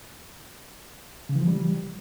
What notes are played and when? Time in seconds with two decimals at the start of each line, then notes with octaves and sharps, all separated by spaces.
1.29 C#3
1.35 E3
1.41 F3
1.47 G3